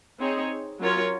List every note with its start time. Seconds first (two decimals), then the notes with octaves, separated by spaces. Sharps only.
0.20 C4 D#4 G#4 C#5
0.79 F#3 C#4 F4 A#4 C#5